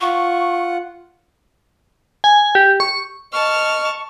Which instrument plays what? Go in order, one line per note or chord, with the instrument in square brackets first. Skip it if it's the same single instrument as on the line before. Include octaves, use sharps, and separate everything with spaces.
[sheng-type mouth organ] F4 F#5 [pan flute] C#6
[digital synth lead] G#5
G4
C#6
[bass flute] D#5 [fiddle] A5 F6 [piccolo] C#6